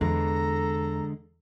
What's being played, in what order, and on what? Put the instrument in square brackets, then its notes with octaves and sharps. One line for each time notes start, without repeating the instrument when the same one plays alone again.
[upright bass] E2 [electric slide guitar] D3 G#3 [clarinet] A4 [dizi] A#5